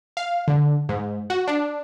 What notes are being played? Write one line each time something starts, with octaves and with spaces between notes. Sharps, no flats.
F5
D3
G#2
F#4
D4